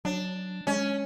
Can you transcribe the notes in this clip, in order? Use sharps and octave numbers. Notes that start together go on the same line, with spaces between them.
F#3 D4
G#3 C#4